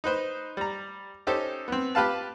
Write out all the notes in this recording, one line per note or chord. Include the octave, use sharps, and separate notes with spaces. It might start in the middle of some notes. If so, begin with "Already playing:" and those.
D#4 B4 C5
G3 A#5
C#4 D#4 G4 A4 C5
B3 C4
F4 G4 B4 F5 A5